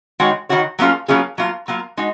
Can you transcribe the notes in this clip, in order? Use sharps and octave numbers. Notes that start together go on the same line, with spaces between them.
D#3 G#3 D#4 F#4 C#5
D#3 G#3 D#4 F#4 C#5
F#3 A#3 C#4 F4 G#4
F#3 A#3 C#4 F4 G#4
F#3 A#3 F4
F#3 A#3 F4
G#3 D#4 F#4